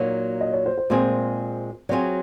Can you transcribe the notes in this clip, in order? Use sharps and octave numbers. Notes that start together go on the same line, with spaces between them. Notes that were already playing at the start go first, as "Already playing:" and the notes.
Already playing: A#2 F#3 A#3 D#4 C#5
D#5
C#5
C5
C5
A#2 G#3 C4 F4 G#4 C5
F#3 C4 F4 G#4 C#5